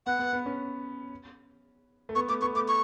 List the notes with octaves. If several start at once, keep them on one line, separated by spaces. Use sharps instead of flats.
B3 F#5
B3
B3
C#4
A3
B3 C#6
A3 D6
B3 C#6
A3 D6
C#6